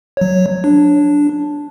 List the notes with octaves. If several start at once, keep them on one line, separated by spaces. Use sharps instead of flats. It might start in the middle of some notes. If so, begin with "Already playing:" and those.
F#3 C#5
D4